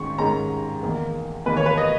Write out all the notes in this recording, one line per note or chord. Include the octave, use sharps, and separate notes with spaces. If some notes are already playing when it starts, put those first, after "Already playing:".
Already playing: G#2 D#3 G#3 C#4 C#6
G#2 D#3 G#3 C#4 A#5
E2 D#3 A#3
E2 D#3 A#3 B4
C#5
B4
D#5